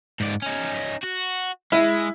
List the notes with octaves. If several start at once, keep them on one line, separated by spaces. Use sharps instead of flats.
G#2 D5
C#4 D#4
F#4
G#3 E4